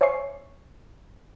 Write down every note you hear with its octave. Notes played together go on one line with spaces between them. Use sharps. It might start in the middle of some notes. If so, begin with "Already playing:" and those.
C5 C#5 E5 G#5 C#6 C7